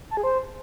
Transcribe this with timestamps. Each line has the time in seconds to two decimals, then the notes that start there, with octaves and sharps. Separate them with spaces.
0.11 A5
0.17 G#4
0.23 C5